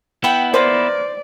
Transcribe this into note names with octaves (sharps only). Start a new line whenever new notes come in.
B3 E4 F#5 G5
A#3 B4 C5 D5 D6